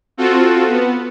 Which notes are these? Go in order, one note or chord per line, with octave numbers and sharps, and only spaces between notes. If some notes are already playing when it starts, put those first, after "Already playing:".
C4 F4 F#4 A4
B3